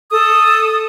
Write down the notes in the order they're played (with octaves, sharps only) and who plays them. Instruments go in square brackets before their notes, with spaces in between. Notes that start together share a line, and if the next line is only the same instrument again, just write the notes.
[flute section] A4 D#6